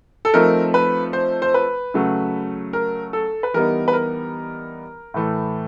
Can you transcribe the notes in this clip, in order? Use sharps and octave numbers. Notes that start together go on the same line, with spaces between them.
A4
F3 A3 C4 D#4 A#4
B4
C5
C5
B4
C#3 F#3 A3
A#4
A4
B4
E3 G3 B3 D#4 A#4
B4
A#4
A2 E3 A3